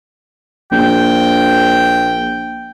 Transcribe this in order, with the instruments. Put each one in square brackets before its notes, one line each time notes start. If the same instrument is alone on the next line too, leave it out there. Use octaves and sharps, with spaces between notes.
[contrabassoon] A#1 [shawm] G5